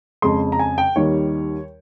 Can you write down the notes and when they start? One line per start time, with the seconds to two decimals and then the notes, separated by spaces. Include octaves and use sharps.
0.22 F2 C#3 G#3 C6
0.52 A#5
0.59 G#5
0.78 G5
0.96 D#2 D#3 G3 C#5